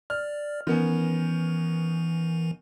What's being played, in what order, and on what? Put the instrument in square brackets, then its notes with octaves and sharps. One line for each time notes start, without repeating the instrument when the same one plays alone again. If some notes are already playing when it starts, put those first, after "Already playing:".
[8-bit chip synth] D5 [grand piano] F6
[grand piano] D#3 B3 C#4 [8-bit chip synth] E3